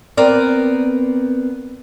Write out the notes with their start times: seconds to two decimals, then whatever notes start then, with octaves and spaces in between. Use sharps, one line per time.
0.17 B3 C4 A#4 D5